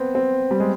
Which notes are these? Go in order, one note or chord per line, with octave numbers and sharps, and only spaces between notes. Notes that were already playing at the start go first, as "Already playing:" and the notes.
Already playing: B3 C4
C4
G3
G#3